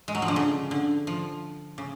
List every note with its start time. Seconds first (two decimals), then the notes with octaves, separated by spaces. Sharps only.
0.08 G#3
0.15 F#3
0.22 F3
0.28 D3
0.36 C#3
0.71 D3
1.07 F3
1.78 C#3